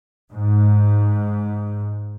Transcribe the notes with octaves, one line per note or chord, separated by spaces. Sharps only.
G#2